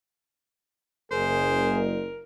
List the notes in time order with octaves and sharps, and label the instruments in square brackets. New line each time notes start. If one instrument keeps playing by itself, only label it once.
[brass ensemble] F#1 [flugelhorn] G#4 [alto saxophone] A#4 [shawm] C5